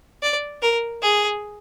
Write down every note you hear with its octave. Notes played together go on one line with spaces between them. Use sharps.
D5
A#4
G#4